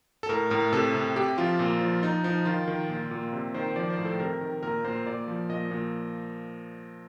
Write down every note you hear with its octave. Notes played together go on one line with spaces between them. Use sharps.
A4
A2 A#4
A2 A#4
C3 A4
C3
C3 G4
F3 F4
A#2
F3
F3 D#4
F3 D#4
D#3 F4
D#3
A#2
A#2
C3
D#3 C5
F3 D5
C5
A2
A4
C3 A#4
D#3
A#2 A#4
A#2 C5
A#2 D5
F3
A#2 D#5
A#2